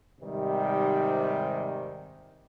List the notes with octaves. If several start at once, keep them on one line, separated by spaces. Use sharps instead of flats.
G#2 C3 D#3 G3